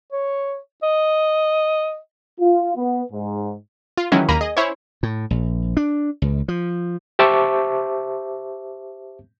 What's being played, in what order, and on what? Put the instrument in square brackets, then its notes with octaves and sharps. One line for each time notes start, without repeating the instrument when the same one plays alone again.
[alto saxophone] C#5
D#5
[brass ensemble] F4
B3
G#2
[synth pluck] F4
D#3 E3 F#3 G#3 C#4 E4
D#2 A#3 A#4 A#5 B5 D#7
G#4 D#5
C#4 E4 C5 C#5
[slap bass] A2
A#1
D4
C#2
F3
[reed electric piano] G4 C5 E5 A5 C#6 D6